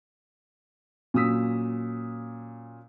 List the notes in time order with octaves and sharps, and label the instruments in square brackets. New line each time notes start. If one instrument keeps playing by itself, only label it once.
[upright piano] A#2 F#3 C#4 D#6 E6 B6